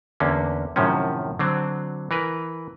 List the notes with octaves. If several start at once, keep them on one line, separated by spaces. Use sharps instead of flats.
E2 D3 A#3 C#4
F#2 A2 C3 D#3 F3 C#4
D3 F#3 C4
E3 A#4 B4